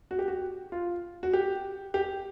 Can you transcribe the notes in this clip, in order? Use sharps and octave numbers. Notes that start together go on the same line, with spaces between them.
F#4
G4
F#4
F4
F#4
G4
G4